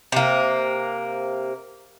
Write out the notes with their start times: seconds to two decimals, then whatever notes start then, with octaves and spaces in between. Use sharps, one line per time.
0.12 C3 A#3